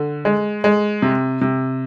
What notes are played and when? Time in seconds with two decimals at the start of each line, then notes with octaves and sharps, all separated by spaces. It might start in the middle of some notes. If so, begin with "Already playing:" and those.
Already playing: D3
0.25 G#3
0.64 G#3
1.02 C3
1.41 C3